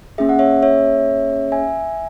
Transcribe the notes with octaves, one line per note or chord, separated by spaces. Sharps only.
A#3 C#4 G#4 E5
F#5
C#5 E5
C#5 E5
E5 G#5